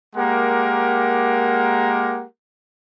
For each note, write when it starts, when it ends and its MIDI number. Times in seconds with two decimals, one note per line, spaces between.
0.16 2.25 56
0.16 2.25 58
0.16 2.25 67
0.16 2.25 70
0.16 2.25 78